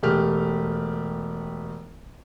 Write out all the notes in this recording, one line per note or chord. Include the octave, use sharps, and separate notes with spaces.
E1 A3 G4 F6